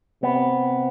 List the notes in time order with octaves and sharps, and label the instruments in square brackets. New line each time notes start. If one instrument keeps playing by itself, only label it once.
[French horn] C3 [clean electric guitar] B3